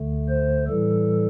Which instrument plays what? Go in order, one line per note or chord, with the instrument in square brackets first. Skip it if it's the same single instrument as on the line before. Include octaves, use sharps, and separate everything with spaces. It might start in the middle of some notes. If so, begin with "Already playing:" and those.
Already playing: [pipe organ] D2 D3 A3
C5
A2 E3 G3 A4